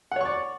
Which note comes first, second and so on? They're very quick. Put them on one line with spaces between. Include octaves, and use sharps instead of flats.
F#5 C#5 C#6 D5